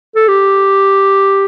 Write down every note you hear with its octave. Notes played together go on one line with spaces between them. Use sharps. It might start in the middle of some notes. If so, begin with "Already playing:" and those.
A4
G4